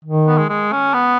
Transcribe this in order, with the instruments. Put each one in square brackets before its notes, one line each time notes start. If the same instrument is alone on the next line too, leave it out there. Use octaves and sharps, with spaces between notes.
[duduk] D#3
[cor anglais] B3
G#3
G#3
C#4
B3